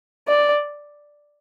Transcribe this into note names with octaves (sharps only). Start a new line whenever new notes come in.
D5